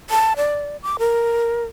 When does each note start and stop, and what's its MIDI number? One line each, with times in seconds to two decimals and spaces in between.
0.10 0.34 81
0.37 0.77 74
0.83 0.97 86
0.99 1.65 70